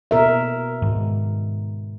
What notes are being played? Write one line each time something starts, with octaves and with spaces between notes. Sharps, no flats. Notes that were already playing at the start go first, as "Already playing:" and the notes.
B2 A#4 E5
G#2 D#3